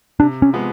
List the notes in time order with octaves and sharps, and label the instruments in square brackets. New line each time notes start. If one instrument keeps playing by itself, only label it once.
[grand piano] C3 [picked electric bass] D4
[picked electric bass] C#4
[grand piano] F3 G#3 B3